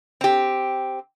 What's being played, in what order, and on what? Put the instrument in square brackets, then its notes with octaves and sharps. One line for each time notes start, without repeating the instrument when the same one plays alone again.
[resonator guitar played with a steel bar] C4 G4